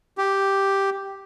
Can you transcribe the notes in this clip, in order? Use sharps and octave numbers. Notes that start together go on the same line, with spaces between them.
G4